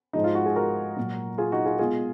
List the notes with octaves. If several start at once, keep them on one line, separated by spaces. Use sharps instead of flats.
G#2 F3 G#3 D#4
F4
F#4
G#4
F#4 A#4
A#2 F#3
F4 G#4
D#4 F#4
F4 G#4
B2 G#3 F4 G#4